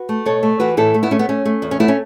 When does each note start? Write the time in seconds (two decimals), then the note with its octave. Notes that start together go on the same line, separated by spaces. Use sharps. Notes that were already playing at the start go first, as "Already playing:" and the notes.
Already playing: F#4 B4
0.09 A3
0.26 B2 A4 C#5
0.43 A3
0.60 E3 F#4 B4
0.77 A2 E4 A4
0.94 A3
1.03 B3 E4
1.11 A3 C#4
1.19 B3
1.29 A3 C#4
1.45 A3
1.62 E2
1.71 C#4
1.80 A3 B3 E4
1.88 C#4